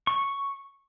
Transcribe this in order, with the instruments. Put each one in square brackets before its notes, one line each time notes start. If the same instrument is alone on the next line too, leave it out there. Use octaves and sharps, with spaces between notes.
[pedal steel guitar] C#6